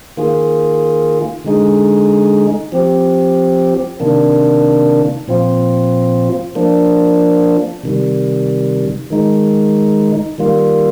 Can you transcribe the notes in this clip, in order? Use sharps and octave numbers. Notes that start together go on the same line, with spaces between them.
D#3 A#3 F4 G#4
D3 G#3 D#4 G#4
F3 C4 G4
C3 D#3 A#3 D4
A#2 F3 C4 F4
F3 A#3 D4
C3 D#3 G3
D#3 G#3 D#4
D#3 G3 A#3 F4